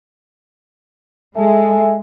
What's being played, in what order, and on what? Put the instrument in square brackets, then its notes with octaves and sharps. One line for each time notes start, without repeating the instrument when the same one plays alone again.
[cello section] G#3 [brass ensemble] A4 E5 G#5